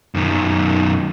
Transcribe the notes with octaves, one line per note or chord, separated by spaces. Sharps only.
F#2 D#3